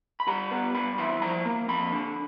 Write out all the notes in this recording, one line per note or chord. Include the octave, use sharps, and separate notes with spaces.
B5
G3 A#5
B3
G2 B5
E3 B5
F3 A#5
A#3
F2 B5
D3